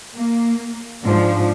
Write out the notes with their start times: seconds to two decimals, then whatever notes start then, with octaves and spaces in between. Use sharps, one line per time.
0.16 A#3
1.04 G#2 F3 D4